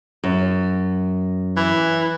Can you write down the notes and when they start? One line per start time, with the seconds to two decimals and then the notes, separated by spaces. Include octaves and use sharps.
0.24 F#2
1.57 E3